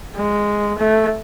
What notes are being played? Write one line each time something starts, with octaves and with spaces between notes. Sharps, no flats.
G#3
A3